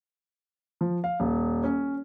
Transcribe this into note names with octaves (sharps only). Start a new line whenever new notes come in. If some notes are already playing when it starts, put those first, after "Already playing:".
F3
F5
D#1
C#4